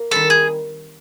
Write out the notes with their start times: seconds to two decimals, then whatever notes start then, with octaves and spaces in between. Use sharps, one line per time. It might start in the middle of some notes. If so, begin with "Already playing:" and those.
Already playing: A#3
0.11 D#3 G3 C4 A4
0.30 G#4